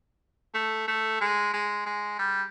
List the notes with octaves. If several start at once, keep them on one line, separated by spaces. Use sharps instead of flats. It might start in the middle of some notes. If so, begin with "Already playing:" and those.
A3
A3
G#3
G#3
G#3
G3